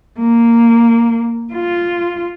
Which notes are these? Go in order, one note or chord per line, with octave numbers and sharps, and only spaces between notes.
A#3
F4